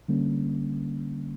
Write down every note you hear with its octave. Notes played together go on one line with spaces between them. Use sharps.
D3 G3 A#3 C#4